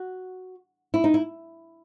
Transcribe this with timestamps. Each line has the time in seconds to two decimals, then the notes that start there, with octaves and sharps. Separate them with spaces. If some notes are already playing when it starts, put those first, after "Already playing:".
Already playing: F#4
0.94 E4
1.04 D#4
1.14 E4